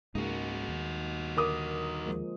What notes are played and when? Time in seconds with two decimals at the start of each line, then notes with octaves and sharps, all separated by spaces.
0.15 C#2 G#2 C#3 G#3 A#3 D#4 F#4
0.69 D#2
1.37 D3 A#4 D6 D#6
2.06 F3 G#3 A#3